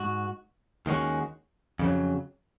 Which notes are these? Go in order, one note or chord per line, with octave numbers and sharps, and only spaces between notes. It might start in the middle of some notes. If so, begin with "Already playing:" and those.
Already playing: G#2 F#4
D#2 D#3 G#3 C#4 F#4
F2 C#3 F#3